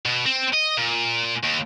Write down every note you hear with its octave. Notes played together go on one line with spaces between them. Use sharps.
B2
C4
D#5
A#2
D#2